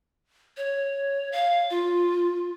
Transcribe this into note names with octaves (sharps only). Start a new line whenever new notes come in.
C#5
F5
F4